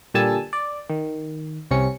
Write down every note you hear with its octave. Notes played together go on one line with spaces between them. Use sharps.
A#2 D3 G3 G#5 A5 E6
D5
D#3
C2 C3 C#4 C#7